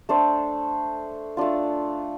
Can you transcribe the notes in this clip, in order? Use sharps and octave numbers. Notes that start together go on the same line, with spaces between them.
A3 D4 A4 C5
A3 D4 F4